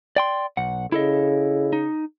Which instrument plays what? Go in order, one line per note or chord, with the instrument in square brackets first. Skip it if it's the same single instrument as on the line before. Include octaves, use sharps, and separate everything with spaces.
[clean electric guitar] D5 G5 C6
B1 F#5
[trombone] C#3 [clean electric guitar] E4 A4 D#5
[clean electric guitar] D#4